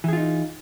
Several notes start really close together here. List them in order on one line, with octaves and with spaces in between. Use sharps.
E3 G#4 F4 D#4